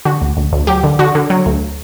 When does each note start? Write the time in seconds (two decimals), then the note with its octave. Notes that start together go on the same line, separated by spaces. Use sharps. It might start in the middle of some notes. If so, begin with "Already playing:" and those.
0.05 D3 F#4
0.22 D2
0.37 D2
0.52 D2
0.67 F#3 G4
0.84 D3
0.99 D3 F#4
1.15 D3
1.30 F#3
1.46 D2